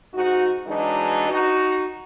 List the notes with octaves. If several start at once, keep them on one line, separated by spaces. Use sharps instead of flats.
G#2 D#4 F#4
E3 F#3 G#3 D4 D#4
D#4 F#4